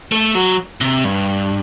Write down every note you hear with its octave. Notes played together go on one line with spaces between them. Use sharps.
A3
F#3
C3
G2